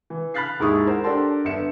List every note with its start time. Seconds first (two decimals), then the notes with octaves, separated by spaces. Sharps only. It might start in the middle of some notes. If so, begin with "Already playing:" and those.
0.10 E3
0.34 B5 F6 F#6 A6 B6 C7
0.59 D#2 G#2 E4 G#4 C#6 D#6
0.87 A#4 C5 F#5
1.04 D4 G4 A4 A#4 A5 C6
1.45 G1 B3 E5 C#7 E7